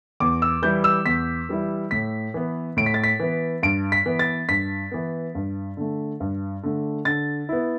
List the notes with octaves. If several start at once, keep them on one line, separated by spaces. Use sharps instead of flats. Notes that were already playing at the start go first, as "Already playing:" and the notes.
E2 D6
E6
E3 G3 E4 G6
E6
E2 B6
E3 G3 E4
A2 B6
E3 B3
A2 D7
B6
A6
B6
E3 B3
G2 D7
B6
E3 B3
A6
G2 B6
E3 B3
G2
D3 A3
G2
D3 A3
D3 A6
B3 E4